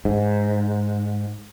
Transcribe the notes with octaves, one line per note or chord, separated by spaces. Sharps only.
G#2